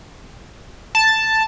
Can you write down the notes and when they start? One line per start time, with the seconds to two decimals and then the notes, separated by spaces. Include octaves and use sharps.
0.95 A5